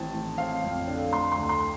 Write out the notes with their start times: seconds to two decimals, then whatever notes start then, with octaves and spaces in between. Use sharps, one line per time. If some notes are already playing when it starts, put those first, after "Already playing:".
Already playing: A1 D#3 C4 A5
0.13 A2
0.38 C4 F5
0.63 F2
0.87 D3
1.12 A3 C6
1.32 C6
1.37 D2
1.49 C6